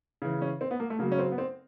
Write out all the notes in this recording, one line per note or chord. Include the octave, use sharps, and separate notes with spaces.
C#3 E3
C#4
C4
B3
A#3
A3
C#3 F#3 A#3
C#4
C4
B3
C4